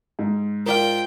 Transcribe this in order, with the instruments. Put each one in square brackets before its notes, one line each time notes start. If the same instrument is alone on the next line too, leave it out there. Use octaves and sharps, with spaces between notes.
[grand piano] G#2
[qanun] F4 C5 [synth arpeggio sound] A#4 D5 F5 [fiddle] G5